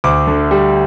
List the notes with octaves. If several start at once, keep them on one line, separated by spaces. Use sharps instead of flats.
D2 D6
D3
G3